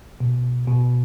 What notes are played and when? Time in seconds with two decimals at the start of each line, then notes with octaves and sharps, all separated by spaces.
0.20 B2
0.67 B2